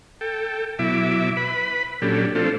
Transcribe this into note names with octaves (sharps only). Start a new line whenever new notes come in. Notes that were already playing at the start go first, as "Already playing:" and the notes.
A4 G5
B2 F#3 E4 E5 D6
B4 B5
A#2 F#3 C#4 D4 G4 A4
F3 A3 C4 D4 F4 A4